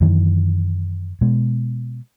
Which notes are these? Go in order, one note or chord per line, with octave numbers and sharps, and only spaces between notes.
F#2 D#3 E3
B2 G#3